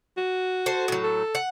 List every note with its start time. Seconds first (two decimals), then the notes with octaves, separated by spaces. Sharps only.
0.17 F#4
0.66 A4 C5
0.88 A2 F#3
1.04 A4
1.35 F#5